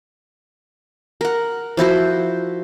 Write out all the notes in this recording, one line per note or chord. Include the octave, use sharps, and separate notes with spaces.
A#4 F#5
F3 E4 F#4 C5